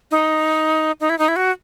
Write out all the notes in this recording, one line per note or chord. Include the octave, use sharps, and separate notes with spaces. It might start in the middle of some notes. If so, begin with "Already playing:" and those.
D#4
D#4
E4
D#4
E4
F#4